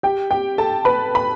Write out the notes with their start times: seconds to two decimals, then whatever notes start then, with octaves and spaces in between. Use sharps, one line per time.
0.03 G4 G5
0.31 G4 G5
0.58 A4 A5
0.85 B4 B5
1.15 B5